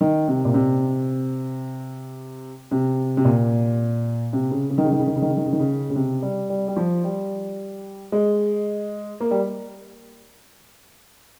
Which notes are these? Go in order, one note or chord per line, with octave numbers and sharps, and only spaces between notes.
D#3
C3
A#2
C3
C3
C3
A#2
C3
C#3
C#3
D#3
C#3
D#3
C#3
D#3
C#3
D#3
C#3
D#3
C#3
D#3
C#3
C#3
C3
G3
G3
G3
F3
G3
G#3
A#3
G3